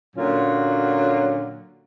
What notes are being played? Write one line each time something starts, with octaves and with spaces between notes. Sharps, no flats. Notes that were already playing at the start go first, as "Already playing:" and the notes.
A#2 D3 F#3 C#4 F4